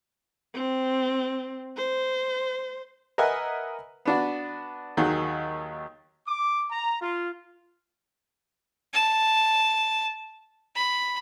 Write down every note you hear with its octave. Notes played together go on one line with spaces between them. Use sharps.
C4
C5
A#4 B4 D#5 E5 F#5 G#5
B3 D4 F#4
D#2 D#3 F#3 G#4 F#5
D6
A#5
F4
A5
B5